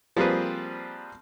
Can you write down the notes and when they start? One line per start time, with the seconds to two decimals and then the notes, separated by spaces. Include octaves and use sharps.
0.17 F3 G3 A#3 C4 G#4 B4